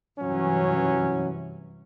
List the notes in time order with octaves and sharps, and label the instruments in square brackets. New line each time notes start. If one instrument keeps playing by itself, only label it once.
[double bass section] G2 C3 E3 [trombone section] F#3 C#4